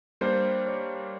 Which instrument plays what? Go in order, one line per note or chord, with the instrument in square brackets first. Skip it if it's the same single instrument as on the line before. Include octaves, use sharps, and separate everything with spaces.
[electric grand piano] G3 A#3 D4 [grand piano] C5
[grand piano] C#5